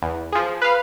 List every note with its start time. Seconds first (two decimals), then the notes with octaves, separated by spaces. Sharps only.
0.02 E2
0.32 F3 G#4
0.62 B4 F5